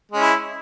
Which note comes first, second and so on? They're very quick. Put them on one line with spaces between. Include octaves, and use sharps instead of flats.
G#3 C#4 E4